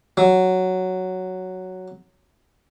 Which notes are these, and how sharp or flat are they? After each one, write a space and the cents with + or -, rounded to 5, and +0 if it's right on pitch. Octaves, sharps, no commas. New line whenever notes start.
F#3 +5